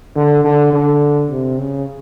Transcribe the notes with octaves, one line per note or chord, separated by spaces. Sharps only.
D3
D3
D3
C3
C#3